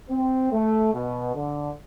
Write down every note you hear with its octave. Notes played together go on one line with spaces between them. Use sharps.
C4
A3
B2
D3